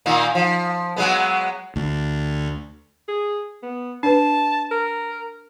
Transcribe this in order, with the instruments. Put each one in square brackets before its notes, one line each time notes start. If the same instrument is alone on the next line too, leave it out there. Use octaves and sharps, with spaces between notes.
[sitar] A#2 D#3 A#3
F3
F#3 G#3 B3
[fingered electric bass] D2
[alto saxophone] G#4
B3
[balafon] D4 B4 [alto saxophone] A5
[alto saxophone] A#4